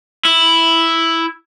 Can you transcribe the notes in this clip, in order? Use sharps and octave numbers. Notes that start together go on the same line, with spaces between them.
E4